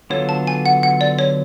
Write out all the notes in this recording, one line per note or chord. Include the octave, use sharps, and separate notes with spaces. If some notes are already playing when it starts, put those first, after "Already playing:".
D3 F#3 B3 F4 A4 C#5
A5
G#5
F#5
F#5
D5
C#5